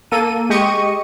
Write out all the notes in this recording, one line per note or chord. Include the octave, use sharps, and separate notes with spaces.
A#3 A4 D#7
G#3 G4 D#5 C#6 C#7 D#7